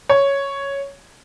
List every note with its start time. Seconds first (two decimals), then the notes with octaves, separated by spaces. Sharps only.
0.09 C#5